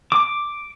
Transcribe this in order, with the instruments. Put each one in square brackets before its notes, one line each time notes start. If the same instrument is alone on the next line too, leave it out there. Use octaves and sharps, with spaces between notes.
[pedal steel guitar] D6